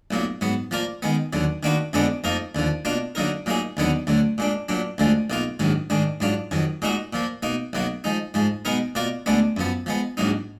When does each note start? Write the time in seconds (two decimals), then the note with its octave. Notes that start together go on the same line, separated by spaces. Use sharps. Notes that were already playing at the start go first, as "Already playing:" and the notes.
0.11 B1 A#2 F#3 A#3
0.41 G#2 F#3 B3
0.71 F3 A#3 F4 A#4 D5
1.02 D#3 G#3 B3
1.33 D#2 D3 F#3
1.63 D#3 A#3 D4 F#4 B4
1.93 F2 D3 G#3 B3 D4
2.24 F2 F3 A#3 D#4 A#4
2.55 D#2 D3 F3
2.85 B2 A#3 D4 F4
3.15 D3 F#3 A#3 D#4 A#4
3.46 A#2 F#3 A#3 D#4 G#4
3.77 D#2 D3 F#3 B3 D#4
4.07 D2 D3 F#3
4.38 A#2 G#3 D4
4.69 A#2 F#3 D4
4.98 D2 D3 F3 G#3
5.30 B1 B2 A#3 F4
5.60 A#1 G#2 D#3 F#3
5.90 G#2 D#3 G#3 D4
6.20 G#2 F#3 D4 F4
6.51 F2 D#3 F#3
6.82 A#2 G#3 D#4 F#4 A#4
7.13 A#2 F3 A#3
7.43 B2 A#3 D#4
7.73 B1 B2 F#3 A#3
8.04 F3 G#3 D#4
8.34 G#2 F3 G#3
8.65 B2 G#3 B3 D#4 A#4
8.95 B2 A#3 F4 A#4 D5
9.26 D2 D3 G#3 B3 D4
9.57 F#2 F3 B3
9.86 F3 G#3 B3
10.17 A#1 G#2 F#3 A#3 D#4